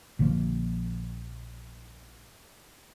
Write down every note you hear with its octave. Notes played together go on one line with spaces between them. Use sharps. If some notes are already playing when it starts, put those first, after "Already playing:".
A#1 D3 F3 A#3